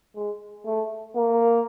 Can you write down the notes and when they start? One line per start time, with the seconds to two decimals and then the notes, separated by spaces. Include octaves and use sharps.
0.16 G#3
0.66 A3
1.16 A#3